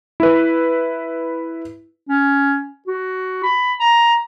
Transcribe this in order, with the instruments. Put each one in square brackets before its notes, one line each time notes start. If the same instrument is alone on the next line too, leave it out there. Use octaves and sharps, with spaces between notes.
[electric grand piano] E4 B4
[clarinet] C#4
F#4
B5
A#5